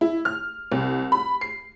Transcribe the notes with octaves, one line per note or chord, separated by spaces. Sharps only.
E4
F6
C2
B5
C7